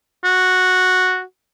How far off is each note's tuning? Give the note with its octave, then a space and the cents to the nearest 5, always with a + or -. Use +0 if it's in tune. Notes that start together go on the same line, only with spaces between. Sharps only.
F#4 -5